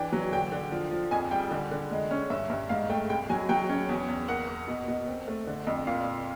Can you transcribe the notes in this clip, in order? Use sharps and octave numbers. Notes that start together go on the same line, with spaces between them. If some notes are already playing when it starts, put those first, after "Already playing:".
Already playing: E3 D4 G5
F#3
D3 G5
D3
F3
F3
F2 G#5
G3 G5
D3
D3
G#3
C#4
G2 E5
G2
G#2 F5
A3 G5
C2 G5
F#3 G#5
F#3 G5
C#4
E2
E2
A#3 F#5
A#3
B2
B2
C4
A3
D3
F2
A#2 F5